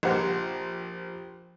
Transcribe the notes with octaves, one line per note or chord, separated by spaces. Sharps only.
A#1 F3 G4 C5 F#5 C6